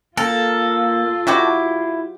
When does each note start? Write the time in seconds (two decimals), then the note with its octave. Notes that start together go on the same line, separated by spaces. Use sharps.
0.17 A#3 F4 A4
1.27 F#3 E4 F#4 G4